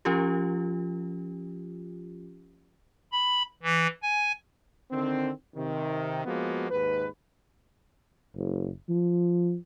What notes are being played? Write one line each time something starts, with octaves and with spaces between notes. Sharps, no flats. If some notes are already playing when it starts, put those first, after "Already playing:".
F3 C#4 F4 G4
B5
E3
G#5
D3 D#3 C4
C3 D#3
F3 G#3 A#3 B3 F#4
D#2 G#2 B4
F#1
F3